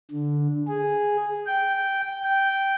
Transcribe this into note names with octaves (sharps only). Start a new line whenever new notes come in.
D3
G#4
G5
G5